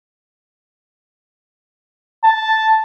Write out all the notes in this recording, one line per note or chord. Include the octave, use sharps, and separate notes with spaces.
A5